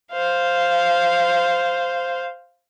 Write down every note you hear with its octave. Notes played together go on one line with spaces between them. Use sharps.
C5 F5